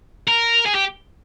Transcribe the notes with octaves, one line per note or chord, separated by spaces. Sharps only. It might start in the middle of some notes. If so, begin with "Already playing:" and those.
A#4
G#4
G4